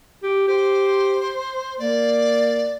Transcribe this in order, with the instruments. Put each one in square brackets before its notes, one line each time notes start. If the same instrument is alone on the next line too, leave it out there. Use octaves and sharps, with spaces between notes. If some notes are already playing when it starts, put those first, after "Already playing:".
[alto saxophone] G4
[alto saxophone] G4 [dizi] C5
[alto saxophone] A#3 [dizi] D5